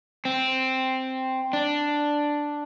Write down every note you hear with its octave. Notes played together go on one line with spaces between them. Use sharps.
C4
D4